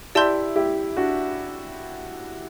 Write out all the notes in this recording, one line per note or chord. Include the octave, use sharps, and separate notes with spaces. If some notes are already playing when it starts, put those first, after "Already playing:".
E4 G4 D5 A5 C6 G6
E4 G4
D4 F#4